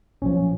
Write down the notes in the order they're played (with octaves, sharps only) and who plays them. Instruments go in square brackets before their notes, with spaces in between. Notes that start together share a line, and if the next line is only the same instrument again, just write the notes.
[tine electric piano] B1 A#2 F3 C#4